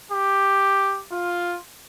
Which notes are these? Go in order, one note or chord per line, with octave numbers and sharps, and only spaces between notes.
G4
F4